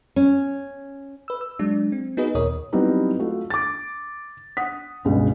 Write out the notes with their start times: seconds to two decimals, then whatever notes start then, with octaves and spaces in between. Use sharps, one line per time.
0.16 C#4
1.28 B4 E6
1.41 E6
1.59 F#3 G#3 D4
1.92 C4
2.17 B3 D#4 F#4 G#4 B4 D#5
2.35 D#2 A#2 A#4 C#5 D#6
2.72 F#3 G3 B3 C4 D#4 E4
3.19 A3 F4 F#4
3.50 D6 A6
4.57 F#5 D#6 B6
5.05 G1 C#2 B2 G#3